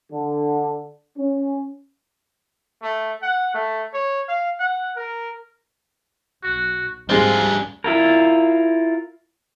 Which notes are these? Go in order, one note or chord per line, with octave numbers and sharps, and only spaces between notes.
D3
C#4
A3
F#5
A3
C#5
F5
F#5
A#4
B1 F#4
D2 G#2 G3 G#3 C4 D4 F4 G#4
E4 F4 A#4